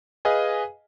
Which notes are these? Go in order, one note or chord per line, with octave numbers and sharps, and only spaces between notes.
G#4 B4 D#5 F5 G#5